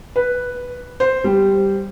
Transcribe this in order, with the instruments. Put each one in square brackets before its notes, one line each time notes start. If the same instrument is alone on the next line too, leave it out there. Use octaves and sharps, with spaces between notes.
[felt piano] B4
C5
G3